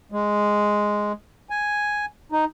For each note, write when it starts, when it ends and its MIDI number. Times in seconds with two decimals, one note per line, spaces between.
0.12 1.12 56
1.50 2.05 80
2.32 2.45 63